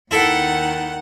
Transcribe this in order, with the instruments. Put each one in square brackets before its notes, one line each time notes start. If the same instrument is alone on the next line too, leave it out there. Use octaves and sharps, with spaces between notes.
[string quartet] D#2 D#3 F#5 [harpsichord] E4 A4